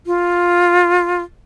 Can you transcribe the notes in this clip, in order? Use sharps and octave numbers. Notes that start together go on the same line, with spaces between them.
F4